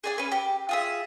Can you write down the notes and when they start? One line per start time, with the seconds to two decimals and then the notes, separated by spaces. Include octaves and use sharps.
0.04 G#4 D5 G#5
0.18 C#4 B4
0.32 G4
0.69 F4 G#4 E5